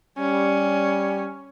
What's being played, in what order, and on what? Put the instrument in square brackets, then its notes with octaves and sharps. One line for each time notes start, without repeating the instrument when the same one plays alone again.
[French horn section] G3 [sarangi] C#4